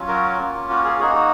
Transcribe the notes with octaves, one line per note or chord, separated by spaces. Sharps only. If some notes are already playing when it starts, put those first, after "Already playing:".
Already playing: F#3 C#4 F4
F#4 A#4
A#3 C#4 F4
F#4
G#4
A#3 D#4 F#4 G#4
F#4